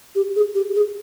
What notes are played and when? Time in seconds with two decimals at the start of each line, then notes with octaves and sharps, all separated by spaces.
0.15 G4
0.36 G#4
0.55 G4
0.75 G#4